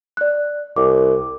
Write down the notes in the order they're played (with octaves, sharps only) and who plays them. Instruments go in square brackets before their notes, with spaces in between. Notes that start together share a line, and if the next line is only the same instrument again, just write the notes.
[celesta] D5 F#6
[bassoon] C2 [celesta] D6